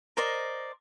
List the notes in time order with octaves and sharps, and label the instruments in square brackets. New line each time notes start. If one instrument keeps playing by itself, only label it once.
[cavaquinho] A#4 C5 D5 D#5